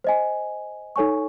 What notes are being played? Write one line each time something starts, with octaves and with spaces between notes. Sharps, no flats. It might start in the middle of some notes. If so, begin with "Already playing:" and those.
C5 D#5 G#5
D#4 A4 C#5 G#5 C#6